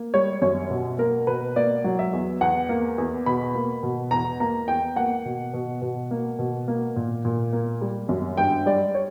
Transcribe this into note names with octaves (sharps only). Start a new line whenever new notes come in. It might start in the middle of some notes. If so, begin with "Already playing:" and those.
Already playing: A#3
G3 C#5
F#2 C#5
B2
A#3 A#4
B2 B4
A#3 D5
F#3
E5
E2
E2 F#5
A#3
E2
B2 B5
A#3
B2
E2 A#5
A#3 A#5
E2 G5
A#3 F#5
B2
B2
B2
A#3
B2
A#3
A#2
A#2
A#3
G3
F#2
G2 G5
G3 D5
C#5